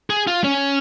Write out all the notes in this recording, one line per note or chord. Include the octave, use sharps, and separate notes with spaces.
G#4
F4
C#4